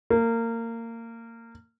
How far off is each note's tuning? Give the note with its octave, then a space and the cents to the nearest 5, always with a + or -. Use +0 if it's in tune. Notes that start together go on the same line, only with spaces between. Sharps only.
A#3 -25